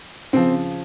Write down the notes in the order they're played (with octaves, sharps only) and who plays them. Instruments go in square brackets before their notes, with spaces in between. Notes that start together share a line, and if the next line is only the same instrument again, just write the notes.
[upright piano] C#3 F3 C4